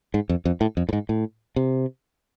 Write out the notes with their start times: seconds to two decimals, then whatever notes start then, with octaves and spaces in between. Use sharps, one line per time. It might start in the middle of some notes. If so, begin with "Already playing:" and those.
0.14 G#2
0.29 F2
0.45 F2
0.61 A2
0.77 F2
0.89 A2
0.93 G#2
1.09 A2
1.56 C3